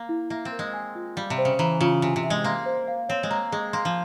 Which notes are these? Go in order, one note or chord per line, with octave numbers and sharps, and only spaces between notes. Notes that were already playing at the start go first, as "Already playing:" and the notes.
Already playing: A#3
E4
A#3 E5
C4
A#4
G#3
G#5
F4
G3 F5
C3
C5
C#3
E3 A#5
C#3 F4
C3 G#5
C3
E5
G#3
A#3 C6
C5
F5
C4 C#5
G#3
A#3 A#5
G#3 G#4
A#3 C6
F3